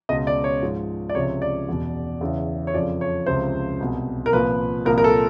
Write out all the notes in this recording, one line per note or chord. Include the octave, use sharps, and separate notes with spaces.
C#2 B2 D#5
D5
C#5
G#2 F3
D5
C#2 C3 F3 C#5
D5
E2 B2
E2 C#3 E3
C#5
F2 C#3 F3 D5
C#5
C#2 C3 F3 C5
C2 B2
A#4
C2 A#2 F3 B4
C2 A#2 F3 A#4
A#4
A4